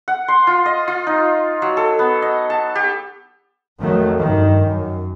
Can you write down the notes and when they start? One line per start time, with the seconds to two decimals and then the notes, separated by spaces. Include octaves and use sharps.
0.08 F#5
0.28 C6
0.47 F4
0.66 D#5
0.88 F4
1.07 D#4
1.62 F#3
1.77 A4
1.99 B3
2.22 D#5
2.50 A5
2.76 G4
3.80 F2 D#3 F#3 A3
4.18 G2 D#3
4.66 F#2